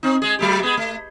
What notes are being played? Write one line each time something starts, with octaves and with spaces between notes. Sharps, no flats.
C4 D#4
G#3 G#4
F#3 A3 G4
G#3 B3 G#4
A3